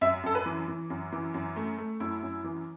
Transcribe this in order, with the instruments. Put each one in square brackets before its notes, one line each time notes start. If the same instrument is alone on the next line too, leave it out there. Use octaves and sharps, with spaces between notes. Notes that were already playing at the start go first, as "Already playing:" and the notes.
[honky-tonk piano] F#2 E5
F#2 A4
B4
E3
E3
F#2
E3
F#2
A3
A3
F#2 E4
F#2
E3